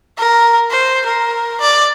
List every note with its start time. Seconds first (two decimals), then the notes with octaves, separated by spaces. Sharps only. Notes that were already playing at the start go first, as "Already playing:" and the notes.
0.18 A#4
0.71 C5
1.06 A#4
1.61 D5